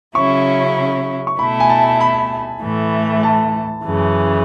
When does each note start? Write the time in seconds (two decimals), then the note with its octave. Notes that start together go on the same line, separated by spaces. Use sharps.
0.15 C#3 F#3 C#4 E4 C#6
1.27 C#6
1.38 B2 A3 E4 B5
1.60 G#5
1.70 A5
2.01 B5
2.61 A2 E3 A3
3.23 A5
3.84 F#2 C#3 E3